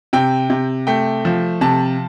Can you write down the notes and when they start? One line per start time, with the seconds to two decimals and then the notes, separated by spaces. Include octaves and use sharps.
0.13 C3 G5
0.50 C3
0.87 A3 G5
1.25 F3
1.61 C3 A5